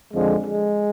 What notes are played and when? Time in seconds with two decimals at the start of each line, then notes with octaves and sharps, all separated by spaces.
0.13 F2 D3 F3 G#3
0.45 G#3